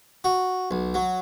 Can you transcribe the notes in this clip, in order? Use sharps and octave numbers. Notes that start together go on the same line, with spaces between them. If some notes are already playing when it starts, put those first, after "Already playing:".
F#4
B1
F#3